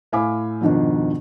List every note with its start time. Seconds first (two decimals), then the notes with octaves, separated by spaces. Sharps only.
0.12 A2 E5 F5 G#5 B5 D6
0.61 F2 G#2 B2 D#3 D4 D#4